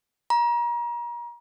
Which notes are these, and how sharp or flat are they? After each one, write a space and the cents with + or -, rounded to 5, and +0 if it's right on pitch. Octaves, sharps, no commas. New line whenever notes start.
A#5 +35